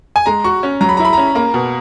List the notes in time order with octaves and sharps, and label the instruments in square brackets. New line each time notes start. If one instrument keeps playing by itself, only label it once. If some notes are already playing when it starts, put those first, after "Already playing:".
[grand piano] G#5
[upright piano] G#3 [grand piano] A#5
[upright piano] F#4 [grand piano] C#6
[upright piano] C#4
[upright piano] F#3 [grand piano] A#5
[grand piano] B5
[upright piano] E4 [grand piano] A#5
[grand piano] B5
[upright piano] C#4 [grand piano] A#5
[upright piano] A#3 [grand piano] A#5
[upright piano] B2